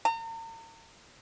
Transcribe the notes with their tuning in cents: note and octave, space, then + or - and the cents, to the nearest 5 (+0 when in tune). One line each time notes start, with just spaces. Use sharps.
A#5 -40